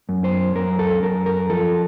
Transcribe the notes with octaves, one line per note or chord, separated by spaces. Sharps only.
F#2
C5
F#2 A#4
A4
F#2 A#4
A#4
F3 A4